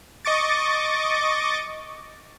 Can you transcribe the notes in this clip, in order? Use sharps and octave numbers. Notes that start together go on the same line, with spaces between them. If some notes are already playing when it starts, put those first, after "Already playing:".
D#5 C#6 D6 A6